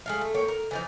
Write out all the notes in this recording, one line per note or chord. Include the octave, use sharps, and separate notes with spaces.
G#3 A3 F5
A3
A#3 C#5 G5
A#4
E3 F3 D#4